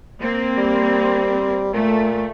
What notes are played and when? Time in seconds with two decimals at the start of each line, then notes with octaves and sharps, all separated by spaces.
0.21 A#3 C4
0.57 G3
1.74 A#2 A3